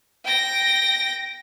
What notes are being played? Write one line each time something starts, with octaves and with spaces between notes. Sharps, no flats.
G5 A#6